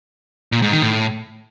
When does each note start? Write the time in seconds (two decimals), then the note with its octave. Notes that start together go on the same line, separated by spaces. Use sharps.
0.52 A#2
0.62 G#2
0.72 D#3
0.82 A2